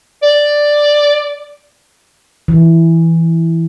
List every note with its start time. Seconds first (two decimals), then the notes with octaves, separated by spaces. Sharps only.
0.23 D5
2.48 E3